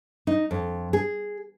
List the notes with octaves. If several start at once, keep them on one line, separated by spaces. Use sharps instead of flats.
D#4
F2
G#4